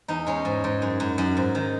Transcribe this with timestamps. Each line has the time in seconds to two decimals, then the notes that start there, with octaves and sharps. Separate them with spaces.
0.08 E2 D#4
0.27 G#3 C#4
0.45 G#2
0.64 G#2
0.82 F#2
1.00 F#2
1.18 F#2
1.37 G#2
1.55 D#3